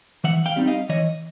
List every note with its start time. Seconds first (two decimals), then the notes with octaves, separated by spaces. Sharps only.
0.24 E3 E5 F#5
0.46 F5 G5
0.56 G3 C4 D#4
0.67 D#5 F5
0.89 E3 C#5 D#5